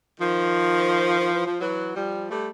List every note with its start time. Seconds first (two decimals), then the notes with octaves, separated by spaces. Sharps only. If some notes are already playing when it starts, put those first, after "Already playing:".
0.20 D#3 F3
1.19 D#3
1.33 E3
1.46 F3
1.60 E3 F#3
1.94 F3 G3
2.30 G3 A3